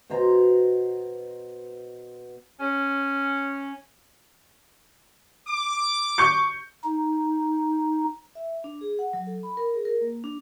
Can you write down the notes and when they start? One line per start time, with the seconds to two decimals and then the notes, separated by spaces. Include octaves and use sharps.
0.10 B2 C5 A#5
2.60 C#4
5.48 D6
6.18 C#6 G6 C#7
6.84 D#4
8.35 E5
8.64 D4
8.81 G#4
8.99 F#5
9.13 F#3
9.27 A4
9.43 B5
9.57 A#4
9.74 G#4
9.85 A#4
10.01 A#3
10.24 D4